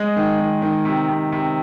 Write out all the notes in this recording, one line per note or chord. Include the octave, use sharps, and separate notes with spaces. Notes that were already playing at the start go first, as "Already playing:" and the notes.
Already playing: G#3 D#5
D#3
D#3
D#3
C3
C3
C3